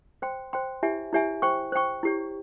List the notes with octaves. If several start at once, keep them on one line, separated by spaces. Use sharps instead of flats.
C5 G5 C6
C5 G5 C6
E4 G4 C#5 E5 G#5
E4 G4 C#5 E5 G#5
C5 G5 C#6
C5 G5 C#6
E4 G4 C#5